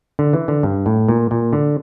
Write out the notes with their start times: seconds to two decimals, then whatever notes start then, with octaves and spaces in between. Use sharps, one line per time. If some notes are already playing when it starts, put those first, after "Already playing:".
0.19 D3
0.33 E3
0.48 D3
0.63 G2
0.86 A2
1.08 A#2
1.31 A#2
1.53 D3